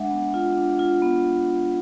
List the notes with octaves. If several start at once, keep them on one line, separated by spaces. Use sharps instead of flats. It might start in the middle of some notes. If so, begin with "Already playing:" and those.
Already playing: G#3 D4 E5 F#5
B3
F4
D4
F4
B3